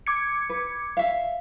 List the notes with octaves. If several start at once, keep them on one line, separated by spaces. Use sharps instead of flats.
D6 G#6 C#7
B4
E5 F5